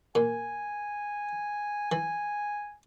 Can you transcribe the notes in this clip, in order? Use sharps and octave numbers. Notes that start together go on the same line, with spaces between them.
A#2 G#5
E3 G#5